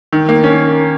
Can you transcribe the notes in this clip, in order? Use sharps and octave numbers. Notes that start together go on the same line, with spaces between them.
D#3
A#3
C#4